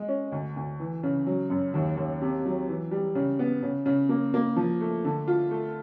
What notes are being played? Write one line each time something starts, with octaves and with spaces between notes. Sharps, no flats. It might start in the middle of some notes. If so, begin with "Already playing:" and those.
Already playing: G#3
C#4
D2
D2
E3
C#3
F#3
F#2
D#2
D#2
C3
F#3
E3
G3
C#3
B3
C#3
C#3
A#3
A#3
F3
A3
D3
F4
A3